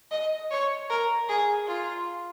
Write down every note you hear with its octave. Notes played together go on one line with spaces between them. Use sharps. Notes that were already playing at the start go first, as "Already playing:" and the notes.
D#5
C#5
A#4
G#4
F4